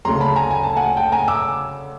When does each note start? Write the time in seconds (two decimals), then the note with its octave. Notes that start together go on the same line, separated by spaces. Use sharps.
0.05 D2 C#3 F#3 A#5 C6
0.20 A5 B5
0.36 G#5 A#5
0.51 G#5
0.63 A5
0.76 F#5 G#5
0.97 G5 A5
1.12 G#5 A#5
1.28 D6 E6